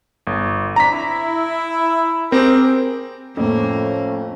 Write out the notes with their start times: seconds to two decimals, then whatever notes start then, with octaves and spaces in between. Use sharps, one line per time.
0.27 G1
0.76 C4 D4 A#5 B6
0.92 E4
2.32 C4 G4 G#4 A#4
3.37 F2 A2 F3 A3 A#3 C#4